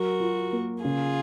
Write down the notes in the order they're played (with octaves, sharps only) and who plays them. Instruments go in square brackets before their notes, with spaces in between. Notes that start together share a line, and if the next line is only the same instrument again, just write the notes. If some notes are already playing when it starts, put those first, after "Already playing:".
Already playing: [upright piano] F#3 [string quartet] F#4 A#4
[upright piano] F4
A#3
[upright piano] C#3 [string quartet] F4 G#4